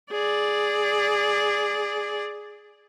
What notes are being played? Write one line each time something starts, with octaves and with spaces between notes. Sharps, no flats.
G#4 D5